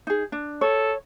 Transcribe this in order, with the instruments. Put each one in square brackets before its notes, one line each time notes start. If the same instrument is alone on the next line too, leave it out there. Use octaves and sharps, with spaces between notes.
[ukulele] D#4 G#4
D4
[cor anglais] A4 [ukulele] C#5